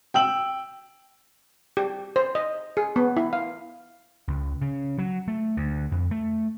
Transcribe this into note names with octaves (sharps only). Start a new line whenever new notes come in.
G5 E6 F#7
G4
C5
D#5
G#4
B3
E4
F5
C#2
C#3
F#3
A3
D2
F2
A3